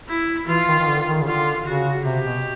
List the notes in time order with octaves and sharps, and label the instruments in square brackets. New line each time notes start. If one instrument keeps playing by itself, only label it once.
[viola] E4
[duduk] E3 [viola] F4
[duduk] D#3
D#3
D3
D#3
C#3
[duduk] D3 [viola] F4
[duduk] C#3 [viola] F#4
[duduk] C3 [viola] G4
[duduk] B2